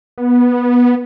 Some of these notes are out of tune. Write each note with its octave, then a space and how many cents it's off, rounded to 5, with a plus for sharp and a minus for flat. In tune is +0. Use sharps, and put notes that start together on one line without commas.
B3 -15